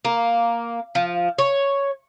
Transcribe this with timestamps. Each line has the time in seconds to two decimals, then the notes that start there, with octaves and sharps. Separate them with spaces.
0.05 A#3
0.95 F3
1.38 C#5